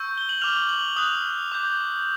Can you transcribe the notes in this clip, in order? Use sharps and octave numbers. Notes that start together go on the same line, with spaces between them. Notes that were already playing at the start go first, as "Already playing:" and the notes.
Already playing: C#6 E6 G6
G7
F#7
D6 F6 F7
F#7
D#6 F#6 F7
D6 G6